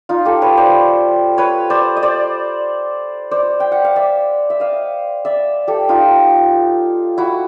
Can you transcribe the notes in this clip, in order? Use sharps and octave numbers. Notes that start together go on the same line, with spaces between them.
D#4 F4
G4 A4
B4 C#5
C5 D5
B4 C#5
C5 D5
D#5
C5 D5
C5 D5
G5
F#5
F5
D5 E5
E5
D#5 F5
D5 E5
G4 A4
D#4 F4
E4 F#4